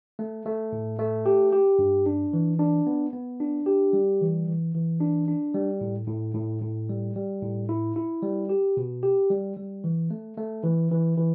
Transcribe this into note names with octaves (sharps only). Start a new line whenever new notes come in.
A3
A3
A2
A3
G4
G4
G2
D4
E3
D4
B3
B3
D4
G4
G3
E3
E3
E3
D4
D4
G3
A2
A2
A2
A2
G3
G3
A2
E4
E4
G3
G4
B2
G4
G3
G3
E3
A3
A3
E3
E3
E3